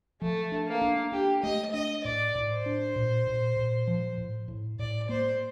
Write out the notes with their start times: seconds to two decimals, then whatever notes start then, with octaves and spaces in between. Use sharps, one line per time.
0.22 F3 A3
0.52 D4
0.67 A#3
0.81 D4
1.12 D4 G4
1.43 A3 D#5
1.73 D4 D#5
2.04 A2 D5
2.35 A2
2.50 C5
2.66 D4
2.96 A#2
3.27 A#2
3.56 A#2
3.87 F3
4.18 A2
4.48 A2
4.79 A2 D5
5.09 A#3 C5